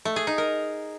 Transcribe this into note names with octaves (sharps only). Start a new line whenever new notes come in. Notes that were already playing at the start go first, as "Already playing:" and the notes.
A3
G#4
D#4
A#4